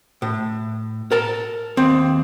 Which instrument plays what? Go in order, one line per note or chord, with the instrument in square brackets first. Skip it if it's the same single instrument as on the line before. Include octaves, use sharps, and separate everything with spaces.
[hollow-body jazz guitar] A2
A#4 A5
D#2 C4